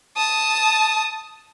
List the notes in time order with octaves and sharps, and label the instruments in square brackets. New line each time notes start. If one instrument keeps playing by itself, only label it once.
[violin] A5 D#6